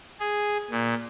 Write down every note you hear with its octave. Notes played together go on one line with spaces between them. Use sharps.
G#4
A#2